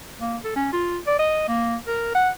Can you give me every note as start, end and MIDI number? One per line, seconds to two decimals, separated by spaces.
0.21 0.37 58
0.44 0.53 69
0.56 0.68 61
0.73 0.98 65
1.07 1.19 74
1.19 1.44 75
1.48 1.76 58
1.87 2.11 70
2.15 2.30 78